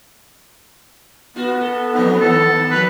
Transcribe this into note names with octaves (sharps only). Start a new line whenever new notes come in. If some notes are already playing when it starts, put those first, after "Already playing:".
B3 F4 F#4
A4
F3 C4 D#4
A2 D#3 A4
F3 A#3 B4